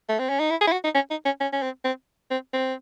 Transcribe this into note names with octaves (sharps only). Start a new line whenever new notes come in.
A3
C4
C#4
D#4
E4
G#4
E4
F#4
D#4
C#4
D#4
C#4
C#4
C#4
C4
C4
C4
C4